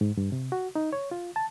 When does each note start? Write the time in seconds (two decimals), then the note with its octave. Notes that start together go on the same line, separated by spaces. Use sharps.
0.01 G#2
0.17 G2
0.32 C3
0.52 F#4
0.75 D#4
0.93 C#5
1.11 F4
1.36 A5